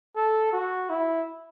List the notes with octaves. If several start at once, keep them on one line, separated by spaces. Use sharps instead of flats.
A4
F#4
E4